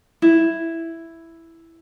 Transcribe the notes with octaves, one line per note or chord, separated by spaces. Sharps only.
E4